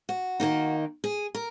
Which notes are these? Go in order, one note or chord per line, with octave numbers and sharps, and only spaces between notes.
F#4
D#3 A#3 D#4
G#4
A#4